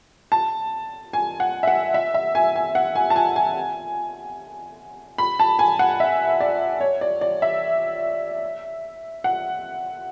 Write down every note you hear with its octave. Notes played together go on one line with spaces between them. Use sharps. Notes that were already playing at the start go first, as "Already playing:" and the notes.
A5
G#5
F#5
E5
F#5
E5
E5
G#5
G#5
F#5
G#5
A5
G#5
G#5
B5
A5
G#5
F#5
E5
D5
C#5
D5
D5
E5
F#5